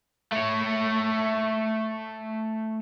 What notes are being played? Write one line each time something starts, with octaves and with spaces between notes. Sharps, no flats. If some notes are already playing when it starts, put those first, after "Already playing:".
A3 C#5